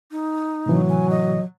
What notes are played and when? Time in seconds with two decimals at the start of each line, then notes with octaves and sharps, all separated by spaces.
0.12 D#4
0.66 A2 C3 E3 F#3
0.89 G#5
1.10 D#5